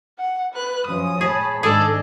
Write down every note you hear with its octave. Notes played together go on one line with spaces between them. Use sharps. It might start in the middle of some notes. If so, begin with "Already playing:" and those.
F#5
B4 F#6
F#2 F3 C#4 D#6
G#4 C#5 A5 B5
G#1 G#2 D4 G#4 A4 D5 D#5